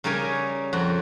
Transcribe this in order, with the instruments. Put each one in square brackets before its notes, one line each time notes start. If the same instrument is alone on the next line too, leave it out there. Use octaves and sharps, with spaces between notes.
[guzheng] C#3 G3 A#4 C#5 G#5
F2 F#4